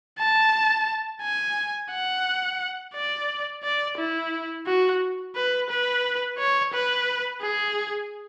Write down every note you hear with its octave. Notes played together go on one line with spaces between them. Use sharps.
A5
G#5
F#5
D5
D5
E4
F#4
B4
B4
C#5
B4
G#4